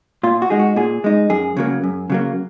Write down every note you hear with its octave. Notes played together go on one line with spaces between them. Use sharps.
A#2 F4
F#4
G#3 D#4 G#4
F#4
A#2 G#4
G#3 D#4
F#2 G#4
C#3 F#3 A#3
F#2
C#3 F#3 A#3